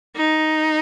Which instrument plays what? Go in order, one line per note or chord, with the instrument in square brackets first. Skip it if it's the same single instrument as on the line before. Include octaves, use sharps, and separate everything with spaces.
[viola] D#4